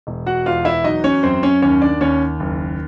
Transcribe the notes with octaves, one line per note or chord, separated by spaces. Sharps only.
E1
F#4 F#5
E2 F4 F5
E4 E5
F#3 D#4 D#5
C#4 C#5
F#2 C4 C5
C#4 C#5
D#2 C#4 C#5
D4 D5
D#2 C#4 C#5
F#1